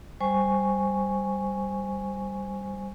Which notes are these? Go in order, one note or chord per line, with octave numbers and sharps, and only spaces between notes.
G3 C5 G#5 C#6